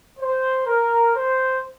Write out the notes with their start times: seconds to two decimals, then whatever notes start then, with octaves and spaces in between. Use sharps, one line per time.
0.19 C5
0.67 A#4
1.16 C5